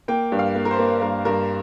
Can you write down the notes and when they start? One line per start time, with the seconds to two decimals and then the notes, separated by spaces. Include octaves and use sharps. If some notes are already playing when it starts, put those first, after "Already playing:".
0.08 A#3 G5
0.32 G2
0.39 F5
0.55 A#3
0.65 A#4
0.71 C5
0.79 A#3
1.01 G2 A#4
1.25 G2 A#4